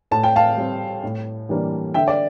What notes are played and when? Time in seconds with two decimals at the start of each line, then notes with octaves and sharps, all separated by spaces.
0.11 A2 A5
0.23 G5
0.36 F5 A5
0.57 G3 C4
1.04 A2
1.49 E3 G3 A#3 D4
1.94 D3 E5 G5
2.08 D5